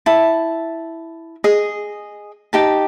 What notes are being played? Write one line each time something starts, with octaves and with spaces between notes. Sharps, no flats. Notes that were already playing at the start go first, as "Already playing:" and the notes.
E4 A5
G#4 D#5
D#4 G4 A5